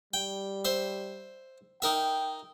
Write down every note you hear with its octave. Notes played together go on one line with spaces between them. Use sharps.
G3 G5
C5 E5
D#4 A#4 E5 G5